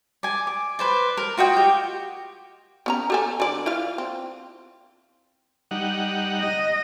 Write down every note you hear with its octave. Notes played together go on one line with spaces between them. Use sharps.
D5 G#5
D6
B4 C5 D5
A#4
F4 F#4 D#5 G5
G4
B3 C#4 A#5
G4 A4 G#5
D3 D5
E4 F4 F5
C4
G3 D#4 F#5
D#5